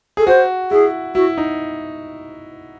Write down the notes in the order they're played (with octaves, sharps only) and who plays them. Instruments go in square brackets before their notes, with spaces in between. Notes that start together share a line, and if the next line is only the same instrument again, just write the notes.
[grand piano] G#4 [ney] A4
[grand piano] F#4 [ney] C5
[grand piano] E4 [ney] G#4
[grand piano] E4 [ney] F#4
[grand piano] D#4